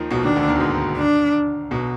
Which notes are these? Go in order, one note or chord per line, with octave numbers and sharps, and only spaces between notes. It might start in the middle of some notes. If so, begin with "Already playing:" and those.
Already playing: D#2 D#3 F3
B1 B2
D#2 D#3 D4
D2 D3
D#2 D#3
B2
G#2
D4
B1 B2